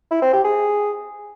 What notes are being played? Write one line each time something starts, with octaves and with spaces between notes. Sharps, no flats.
E4
C4
G4
G#4